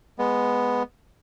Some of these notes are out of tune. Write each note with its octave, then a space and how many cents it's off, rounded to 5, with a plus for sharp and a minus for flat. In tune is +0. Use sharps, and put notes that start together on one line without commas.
G#3 -5 B3 +0